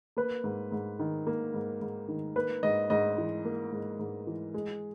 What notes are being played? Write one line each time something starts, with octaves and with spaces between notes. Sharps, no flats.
A#3 B4
G#2
G#2
D#3
A#3
G#2
G#2
D#3
A#3 B4
G#2 D#5
G#2 D#5
E3
A#3
G#2
G#2
E3
G#3